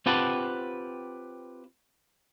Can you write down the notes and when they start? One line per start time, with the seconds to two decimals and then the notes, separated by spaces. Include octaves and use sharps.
0.06 C4 F4 G4 B4 F#5 A5